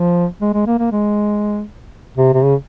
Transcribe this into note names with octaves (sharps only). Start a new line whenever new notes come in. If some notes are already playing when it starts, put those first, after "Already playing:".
Already playing: F3
G#3
G#3
A#3
A#3
G#3
C3
C3
C#3